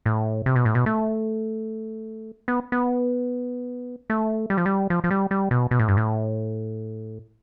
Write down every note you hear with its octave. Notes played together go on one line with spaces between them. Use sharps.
A2
C3
B2
A2
B2
A3
B3
B3
A3
G3
F3
G3
F3
F3
G3
G3
B2
B2
A2
G2
A2